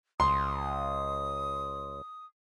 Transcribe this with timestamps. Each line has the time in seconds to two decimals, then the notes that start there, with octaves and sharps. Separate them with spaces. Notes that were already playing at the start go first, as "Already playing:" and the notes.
0.20 C#2 C6 D#6